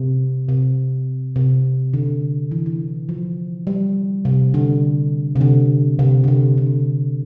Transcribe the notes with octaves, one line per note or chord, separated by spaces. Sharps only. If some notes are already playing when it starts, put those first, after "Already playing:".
Already playing: C3
C3
C3
D3
E3
E3
F3
G3
C3
D3
C3
D3
C3
D3
C3
D3